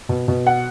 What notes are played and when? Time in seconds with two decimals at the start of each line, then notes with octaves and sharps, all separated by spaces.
0.09 B2
0.28 B2
0.47 F#5